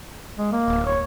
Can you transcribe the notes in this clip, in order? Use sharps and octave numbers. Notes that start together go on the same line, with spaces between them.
G#3
A#3
D1
C#5